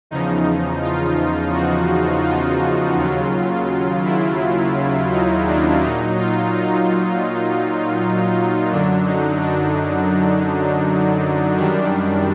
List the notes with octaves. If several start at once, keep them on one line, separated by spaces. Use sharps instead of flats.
E2 C#3 F3 D#4
F4
F#4
F4
D#2 C#3 F#3
E4
D#4
D4
A#2 F#3 D#4
F4
D#4
F#2 D3 F#3 D4
D#4
D4
F#2 D#3 G3 D4